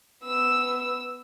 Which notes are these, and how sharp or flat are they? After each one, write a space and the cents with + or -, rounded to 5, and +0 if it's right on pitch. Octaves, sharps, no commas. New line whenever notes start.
B3 +10 E6 +0